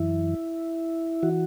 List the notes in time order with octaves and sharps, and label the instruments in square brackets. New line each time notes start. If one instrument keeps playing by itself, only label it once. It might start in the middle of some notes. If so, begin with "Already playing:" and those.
Already playing: [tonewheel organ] F#2 E3 E4
E3 F#4